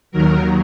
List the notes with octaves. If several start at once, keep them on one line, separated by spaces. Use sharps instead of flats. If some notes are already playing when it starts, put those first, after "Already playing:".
D#2 D#3 F#3 A#4